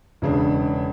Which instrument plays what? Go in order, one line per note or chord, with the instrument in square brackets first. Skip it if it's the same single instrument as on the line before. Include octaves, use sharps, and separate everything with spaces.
[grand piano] E1 C#3 D4